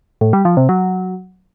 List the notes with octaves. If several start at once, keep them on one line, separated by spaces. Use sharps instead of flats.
A2
G3
F3
C3
F#3